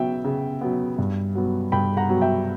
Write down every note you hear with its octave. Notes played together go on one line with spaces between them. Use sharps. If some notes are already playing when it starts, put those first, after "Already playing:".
Already playing: C#3 F#3 B3 E5 G5
C#3
F#3 B3
G2
F#3 B3
G2 G5 B5
F#5 A#5
F#3 B3
E5 G5